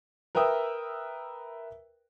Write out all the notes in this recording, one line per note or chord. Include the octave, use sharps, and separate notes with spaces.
A#4 B4 E5 G5 D#6 E6